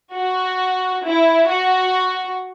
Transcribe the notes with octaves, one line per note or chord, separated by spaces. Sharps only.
F#4
E4
F#4